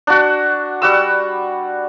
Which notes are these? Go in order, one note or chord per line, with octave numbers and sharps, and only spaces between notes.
D4 F#4
G3 F#4 E6